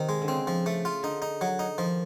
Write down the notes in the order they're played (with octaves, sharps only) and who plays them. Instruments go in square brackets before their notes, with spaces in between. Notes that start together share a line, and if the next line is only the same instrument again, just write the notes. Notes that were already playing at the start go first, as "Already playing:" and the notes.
Already playing: [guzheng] C3 [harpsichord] D#3
[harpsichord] G#3
[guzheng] D3
[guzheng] C#3 [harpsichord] C4
[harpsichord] F3
A3
F4
[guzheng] D3 [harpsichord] D#4
[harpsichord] D#4
F#3
D#4
[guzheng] D#3 [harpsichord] F3